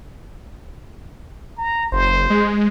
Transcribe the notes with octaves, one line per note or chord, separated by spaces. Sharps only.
A#5
F#1 C5
G#3